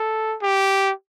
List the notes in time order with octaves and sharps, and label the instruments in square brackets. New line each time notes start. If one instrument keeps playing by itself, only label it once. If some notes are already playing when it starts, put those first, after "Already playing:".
Already playing: [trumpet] A4
G4